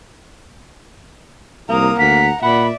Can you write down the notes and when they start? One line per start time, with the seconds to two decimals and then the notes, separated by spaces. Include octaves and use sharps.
1.69 C2 A#3 A#5 D#6
1.99 D2 F#5 A#5 B6
2.43 A#2 D5 E5 F#5 B5